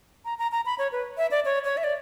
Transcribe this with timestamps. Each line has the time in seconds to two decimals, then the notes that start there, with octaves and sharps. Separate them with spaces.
0.25 A#5
0.39 A#5
0.52 A#5
0.66 B5
0.78 C#5
0.92 B4
1.18 E5
1.31 D5
1.45 C#5
1.64 C#5
1.77 E5
1.84 D5